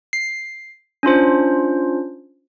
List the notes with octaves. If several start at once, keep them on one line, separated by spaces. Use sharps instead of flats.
C7
C#4 D4 F4 C5